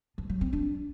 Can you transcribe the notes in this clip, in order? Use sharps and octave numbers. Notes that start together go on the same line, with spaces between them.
F3
F#3
C4
D4